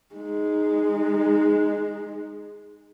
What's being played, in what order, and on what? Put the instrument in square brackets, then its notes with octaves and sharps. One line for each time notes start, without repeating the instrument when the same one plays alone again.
[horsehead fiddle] G#3 D#4